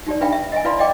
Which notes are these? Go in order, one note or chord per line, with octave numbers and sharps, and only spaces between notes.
D#4 G4 D5
D4 B4 E5 F5 G5 B5
E5
D#5 E5 G#5
E4 B4 D5 F5 B5 C6
D5 D#5 F5 G5 D6